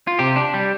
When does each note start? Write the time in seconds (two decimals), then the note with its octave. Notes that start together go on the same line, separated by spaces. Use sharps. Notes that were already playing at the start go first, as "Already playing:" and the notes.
0.07 F4
0.19 C3 G4
0.36 D4
0.54 G3